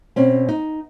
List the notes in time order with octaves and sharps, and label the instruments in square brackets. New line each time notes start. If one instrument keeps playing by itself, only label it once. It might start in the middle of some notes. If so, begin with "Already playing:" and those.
[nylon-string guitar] B2 C4 C#4
D#4